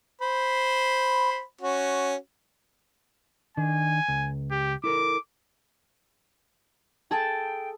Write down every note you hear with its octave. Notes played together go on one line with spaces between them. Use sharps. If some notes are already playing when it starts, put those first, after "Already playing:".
C5 B5
C#4 F#4
D#3 D4 G#5
C#2
G4
E4 A4 A#4 D6
G#4 A4 G5 A5